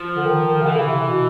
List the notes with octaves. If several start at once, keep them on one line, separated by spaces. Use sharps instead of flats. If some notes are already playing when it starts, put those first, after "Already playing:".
Already playing: F3
D3
D#3
D#3
C#3
D3 E3
C#3
C3
B2